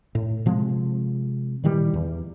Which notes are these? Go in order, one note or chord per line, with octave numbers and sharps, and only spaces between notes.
A2
C3 F3 G#3 C4
A#2 D#3 E3 G3
E2